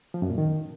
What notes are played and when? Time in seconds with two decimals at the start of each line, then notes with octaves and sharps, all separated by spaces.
0.14 F3
0.22 F#2
0.30 A#2
0.38 D#3